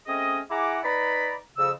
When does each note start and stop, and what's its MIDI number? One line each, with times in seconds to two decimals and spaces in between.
0.07 0.38 57
0.07 0.38 60
0.07 0.38 61
0.07 0.38 68
0.07 0.38 75
0.50 0.78 64
0.50 0.78 68
0.50 0.78 78
0.50 0.78 82
0.50 0.78 86
0.83 1.34 63
0.83 1.34 71
0.83 1.34 74
0.83 1.34 82
0.83 1.34 83
1.57 1.70 41
1.57 1.70 49
1.57 1.70 88